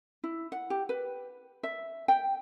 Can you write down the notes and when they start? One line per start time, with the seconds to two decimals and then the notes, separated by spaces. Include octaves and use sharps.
0.24 E4
0.52 F#5
0.70 G4
0.89 B4
1.63 E5
2.08 G5